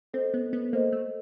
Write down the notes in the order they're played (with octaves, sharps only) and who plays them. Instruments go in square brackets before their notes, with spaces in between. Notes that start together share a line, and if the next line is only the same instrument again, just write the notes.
[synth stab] C4 [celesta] A4 C5 D#5
[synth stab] B3
B3
[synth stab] A#3 [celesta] A4 C5 D#5
[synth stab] A3